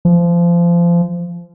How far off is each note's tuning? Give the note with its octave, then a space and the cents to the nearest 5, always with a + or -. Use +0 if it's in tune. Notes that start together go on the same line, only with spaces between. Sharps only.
F3 -25